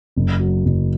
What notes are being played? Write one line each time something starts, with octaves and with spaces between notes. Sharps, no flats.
F#1
F#3
F#1